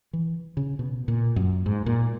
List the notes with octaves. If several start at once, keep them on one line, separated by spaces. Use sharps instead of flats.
E3
C#3
B2
A#2
F#2
G#2
A#2